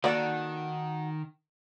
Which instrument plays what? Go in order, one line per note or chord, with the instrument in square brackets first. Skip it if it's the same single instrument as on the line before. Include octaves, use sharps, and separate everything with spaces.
[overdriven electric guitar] D#3 [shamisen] A#3 D5 [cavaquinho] F#4 A4 F#5